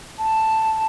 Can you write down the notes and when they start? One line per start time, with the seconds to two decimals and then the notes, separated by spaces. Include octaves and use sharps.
0.18 A5